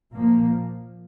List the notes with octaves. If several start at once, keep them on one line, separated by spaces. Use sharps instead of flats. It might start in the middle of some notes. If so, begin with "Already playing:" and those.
A#2 F3 A#3